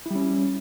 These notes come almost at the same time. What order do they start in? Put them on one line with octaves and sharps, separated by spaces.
E4 G3 C#4